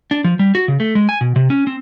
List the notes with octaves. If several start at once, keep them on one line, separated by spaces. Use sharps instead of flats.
D4
F3
G3
F#4
C#3
A3
G#3
G#5
B2
C3
C#4
C4